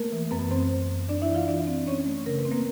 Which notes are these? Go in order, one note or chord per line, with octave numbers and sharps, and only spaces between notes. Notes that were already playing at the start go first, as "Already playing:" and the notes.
Already playing: A3 A#3 A#4
E3
F#2 B3 B4
F#2 C4 C5
F#2
F#2
F#2 D4 D5
E4 E5
E3
F4 F5
E3 D4 D5
C4
C4 C#4 C#5
A3
C#3 A#4
B4
C4
A#3 A#4